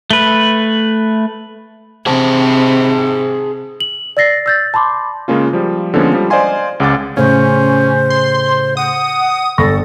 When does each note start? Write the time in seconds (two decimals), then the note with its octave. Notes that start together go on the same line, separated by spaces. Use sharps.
0.11 A3 B4
2.06 C3 G#4 C5 A5
3.80 F#7
4.17 D5 E6 A6 A#6 C7
4.46 E6 G6 A6
4.74 A5 B5 C6 D6
5.28 C#3 G#3 A#3 C#4 F4
5.53 F3 G3
5.94 D3 F3 G#3 A#3 B3 C#4
6.13 F3 G3
6.30 C5 D5 D#5 F5 G#5 C6
6.80 C#2 C#3 F#5 D6 A6
7.17 A2 C#3 C#4 C5
8.10 C6
8.77 F#5 D#6
9.58 G1 A4 C#6 A#6